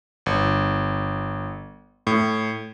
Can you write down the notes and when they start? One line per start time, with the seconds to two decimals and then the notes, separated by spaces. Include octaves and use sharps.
0.26 G1
2.07 A2